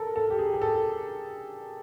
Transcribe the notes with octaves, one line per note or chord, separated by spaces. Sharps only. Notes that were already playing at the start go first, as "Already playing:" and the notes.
Already playing: A4 A#4
A4
G4
G#4
G#4
A4